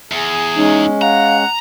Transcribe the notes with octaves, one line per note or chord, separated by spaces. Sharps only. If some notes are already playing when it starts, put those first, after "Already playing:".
E2 G#4
G#3 C#4 D#4
F5 F#5 A#5